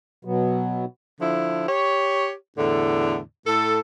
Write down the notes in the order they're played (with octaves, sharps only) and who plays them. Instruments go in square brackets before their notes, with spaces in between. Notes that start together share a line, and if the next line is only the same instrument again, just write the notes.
[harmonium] B2 F#3 B3
[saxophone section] D3 F3 E4
G4 C#5
E2 A2 D3
A2 A4